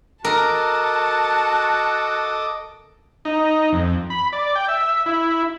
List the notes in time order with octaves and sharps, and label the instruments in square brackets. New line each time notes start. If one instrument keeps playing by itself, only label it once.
[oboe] F#4 [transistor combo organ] A4 D#5 D6 [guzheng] A#4 [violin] A5
[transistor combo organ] D#4
F2
B5
D5
G5
E5
E4